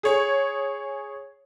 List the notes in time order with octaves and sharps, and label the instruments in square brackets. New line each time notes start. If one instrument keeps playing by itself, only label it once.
[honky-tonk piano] G#4 C#5